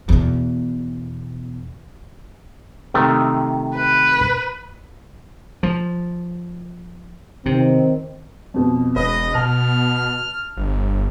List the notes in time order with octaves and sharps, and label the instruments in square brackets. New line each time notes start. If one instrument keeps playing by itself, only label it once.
[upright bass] E2 B2
[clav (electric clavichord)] C3 D#3 A3
[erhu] B4
[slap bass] F3
[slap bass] C3 [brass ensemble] D#3 C4
[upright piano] F2 B2
[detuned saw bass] E1 [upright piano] B4 [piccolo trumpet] D#5
[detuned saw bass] B2 [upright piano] A5 [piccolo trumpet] F6
[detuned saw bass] G1